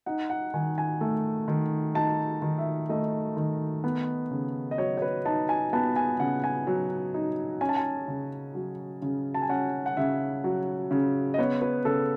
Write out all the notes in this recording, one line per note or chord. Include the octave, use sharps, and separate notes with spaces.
D#4 F#5
F#5
D#3 G#5
G#5
A3
D#3
D#4 A5
D#3
E5
A3 D#5
D#3
B3
C#3
D#5
F#3 C#5
C#5
B4
D#4 A5
G#5
B3 A5
G#5
C#3 F#5
G#5
F#3
D#4
C#4 G#5
A5
G#5
C#3
F#3
C#3
A5
G#5
C#4 F#5
F#5
C#3 E5
F#3
C#3
D#5
B3 C#5
B4
C#3 A4